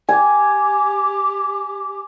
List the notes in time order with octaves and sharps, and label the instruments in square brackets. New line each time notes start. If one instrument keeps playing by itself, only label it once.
[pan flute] G4 [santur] G#5